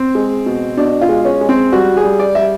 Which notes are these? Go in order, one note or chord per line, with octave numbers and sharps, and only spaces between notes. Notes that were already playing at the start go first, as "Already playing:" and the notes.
Already playing: C4
G#3
B2
B2 D4
F4
G#3
C#4
G#3
C4
G3 F#4
G#4
G3
D5
G3 E5